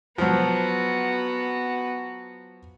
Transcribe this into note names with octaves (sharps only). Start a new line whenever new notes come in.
F3 F#3 B3 F#4